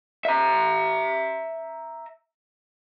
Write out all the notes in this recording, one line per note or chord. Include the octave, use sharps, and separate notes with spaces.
E5 A#5